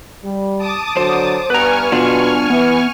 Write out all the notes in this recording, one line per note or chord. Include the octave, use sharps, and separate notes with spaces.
G3
A5 D6 D#6
D3 F#3 C5
G2 B3 B4 G#5 A#5 C#6 F6
B2 B3 D4 F4
E3 B3